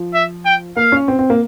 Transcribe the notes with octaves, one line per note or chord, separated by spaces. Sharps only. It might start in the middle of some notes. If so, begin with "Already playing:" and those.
Already playing: F3
E5
G5
A#3 F5
C#4
C4
C4
A#3